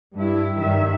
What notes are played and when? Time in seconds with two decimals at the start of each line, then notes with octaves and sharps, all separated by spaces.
0.14 G2 E4
0.58 G2 D#3 E5